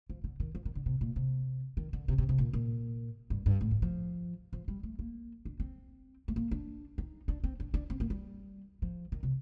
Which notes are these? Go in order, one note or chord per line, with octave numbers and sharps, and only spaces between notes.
F3
D3
D#3
F3
D#3
D3
C3
A#2
C3
D#3
D3
C3
C3
C3
A#2
A#2
G2
G2
A2
G2
F3
F3
G3
A3
A#3
D4
C4
A3
A#3
D4
D#4
D4
C4
D4
D4
C4
A#3
G3
F3
D#3
C3